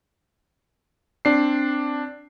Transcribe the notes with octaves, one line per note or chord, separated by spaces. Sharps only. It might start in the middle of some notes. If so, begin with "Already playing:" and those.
C4 D4 C7